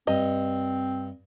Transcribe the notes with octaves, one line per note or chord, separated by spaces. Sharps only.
G2 C4 D#5